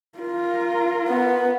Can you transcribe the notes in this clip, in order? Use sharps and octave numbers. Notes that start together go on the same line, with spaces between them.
F4 A#4
B3